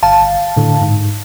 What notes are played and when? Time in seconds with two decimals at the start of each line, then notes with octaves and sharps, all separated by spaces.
0.03 G1 F5 A5
0.57 A2 D3
0.81 G#2